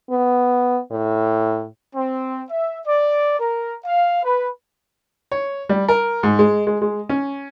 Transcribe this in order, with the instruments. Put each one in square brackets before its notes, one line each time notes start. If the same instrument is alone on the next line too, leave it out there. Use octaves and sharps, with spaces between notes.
[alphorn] B3
A2
[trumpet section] C4
E5
D5
A#4
F5
B4
[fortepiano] C#5
G3
A#4
G#2
G#3
G#3
G#3
C#4